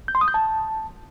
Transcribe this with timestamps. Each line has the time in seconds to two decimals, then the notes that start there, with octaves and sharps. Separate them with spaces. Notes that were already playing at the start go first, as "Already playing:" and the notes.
0.08 G6
0.15 C6
0.21 D#6
0.28 G6
0.34 A5